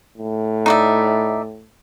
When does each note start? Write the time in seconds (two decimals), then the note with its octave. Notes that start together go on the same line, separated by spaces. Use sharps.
0.17 A2
0.66 D#4 D5 E5